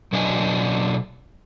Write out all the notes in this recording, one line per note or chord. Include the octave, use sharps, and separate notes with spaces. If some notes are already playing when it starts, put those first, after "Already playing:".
B2 F#3 D4 D#5 G#5